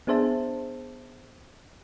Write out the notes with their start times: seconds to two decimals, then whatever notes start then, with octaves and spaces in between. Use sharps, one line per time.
0.07 B3 D4 G#4 C5 E5 A5